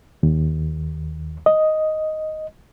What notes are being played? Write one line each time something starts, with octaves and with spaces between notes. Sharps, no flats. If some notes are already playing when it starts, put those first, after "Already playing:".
D#2
D#5